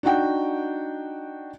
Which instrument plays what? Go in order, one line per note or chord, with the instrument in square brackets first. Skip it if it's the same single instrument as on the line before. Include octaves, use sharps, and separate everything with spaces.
[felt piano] D4 D#4 F#4 F#5 G5